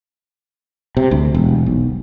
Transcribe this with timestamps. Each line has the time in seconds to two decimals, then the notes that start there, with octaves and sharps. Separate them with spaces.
0.97 C3
1.11 D2
1.34 E1
1.66 B1